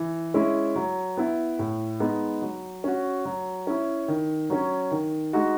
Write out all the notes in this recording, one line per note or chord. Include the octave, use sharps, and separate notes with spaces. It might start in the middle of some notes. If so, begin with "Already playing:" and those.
Already playing: E3
G#3 C#4 E4
F#3
B3 E4
A2
G#3 B3 D#4
F#3
C#4 F#4
F#3
C#4 E4
D#3
F#3 C#4
D#3
G#3 D#4 F#4